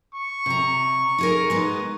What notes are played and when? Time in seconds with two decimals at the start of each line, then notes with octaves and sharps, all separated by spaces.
0.15 C#6
0.46 C3 A#5
1.18 D#4 G#4 A#4
1.50 G#3 B3 D#4